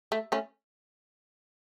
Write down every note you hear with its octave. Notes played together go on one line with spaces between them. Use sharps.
A3
A3 C#4